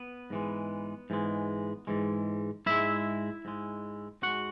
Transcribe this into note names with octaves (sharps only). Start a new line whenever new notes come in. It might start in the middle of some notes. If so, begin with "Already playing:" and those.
Already playing: B3 B4
G#2 E3 G#3
G#2 E3 G#3
G#2 E3 G#3
G#2 G#3 E4 E5
G#2 G#3
G#2 G#3 F#4 F#5